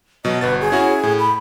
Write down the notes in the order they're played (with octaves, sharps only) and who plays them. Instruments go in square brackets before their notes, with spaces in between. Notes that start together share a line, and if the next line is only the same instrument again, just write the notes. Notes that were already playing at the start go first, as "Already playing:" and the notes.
[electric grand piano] B2 F#3 [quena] D#5
[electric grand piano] G1 F#4 A6 [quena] B4
[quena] G#4
[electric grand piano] C#4 E4 F#4
A2
[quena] B5